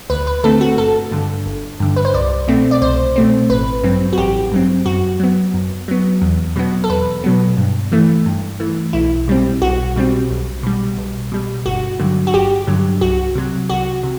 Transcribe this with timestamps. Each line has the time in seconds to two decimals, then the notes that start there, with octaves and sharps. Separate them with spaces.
0.10 D2 B4
0.27 B4
0.44 D3 A3 C4 A4
0.61 F#4
0.78 G1 A4
1.12 G2 D3
1.46 G1
1.80 G2 D3
1.96 B4
2.05 C5
2.14 C2 D5
2.48 B2 A3 C4
2.71 D5
2.82 C2 C5
3.16 B2 A3 C4
3.50 A1 B4
3.84 G2 F#3 C4
4.13 F#4
4.18 A1 G4
4.52 G2 F#3 C4
4.86 F#2 F#4
5.20 F#3 B3
5.54 F#2
5.88 F#3 B3
6.22 E2
6.56 B2 F#3 B3
6.84 A4
6.90 E2 B4
7.24 B2 F#3 B3
7.57 G2
7.92 E3 A3
8.26 G2
8.60 E3 A3
8.93 B1 E4
9.28 B2 G3 C4
9.62 B1 F#4
9.96 B2 G3 C4
10.30 B1
10.63 B2 G3
10.97 B1
11.32 B2 G3
11.66 G1 F#4
12.00 G2 D3 F#3
12.27 F#4
12.33 G1 G4
12.67 G2 D3 F#3
13.01 C2 F#4
13.35 C3 F#3
13.70 C2 F#4
14.03 C3